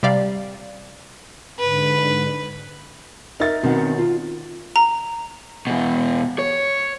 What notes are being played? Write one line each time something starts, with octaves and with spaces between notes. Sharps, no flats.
C3 G3 G4 D5 F5
G#2 D3 B4
D#4 A#4 E5 A6
B2 D#3 C4 C#4 F#5
F4
A#5
E2 B2
C#5